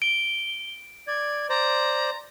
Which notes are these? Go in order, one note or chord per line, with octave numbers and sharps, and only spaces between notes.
D7 G7
D5 G#6
C5 D5 A#5